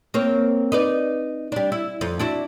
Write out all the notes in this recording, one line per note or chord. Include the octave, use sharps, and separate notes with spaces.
A#3 C4 C#5
D#4 B4 D5
G3 D4
E4
F2
D4 E4 F#4